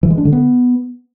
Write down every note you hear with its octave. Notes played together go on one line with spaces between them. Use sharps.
E3
G#3
D4
D3
B3